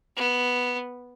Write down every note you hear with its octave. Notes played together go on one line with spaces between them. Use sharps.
B3